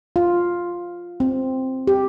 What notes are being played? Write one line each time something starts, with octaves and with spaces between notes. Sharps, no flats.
F4
C4
G4